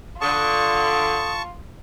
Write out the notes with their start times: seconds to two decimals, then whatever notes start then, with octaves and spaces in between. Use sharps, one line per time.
0.21 D3 F4 A5 C#6 D#6